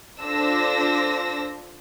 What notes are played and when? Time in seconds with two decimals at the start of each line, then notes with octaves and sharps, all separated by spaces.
0.21 D4 F4 A4 C5 E6 A#6